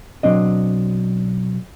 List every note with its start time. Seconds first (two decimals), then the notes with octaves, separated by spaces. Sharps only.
0.23 B1 F2 F#3 C4 D4 D#5